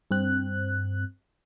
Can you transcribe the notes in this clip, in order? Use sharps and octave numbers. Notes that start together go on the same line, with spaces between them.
G2 C4 F#6